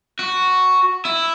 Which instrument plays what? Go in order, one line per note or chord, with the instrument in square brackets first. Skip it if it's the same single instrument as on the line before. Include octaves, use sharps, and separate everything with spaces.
[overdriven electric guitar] F#4
E4